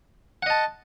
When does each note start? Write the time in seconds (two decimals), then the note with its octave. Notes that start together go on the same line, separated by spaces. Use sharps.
0.43 F#5
0.46 D#5
0.50 A5